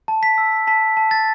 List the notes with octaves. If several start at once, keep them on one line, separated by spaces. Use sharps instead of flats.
A5
B6
E6
A5 B6
A5
A6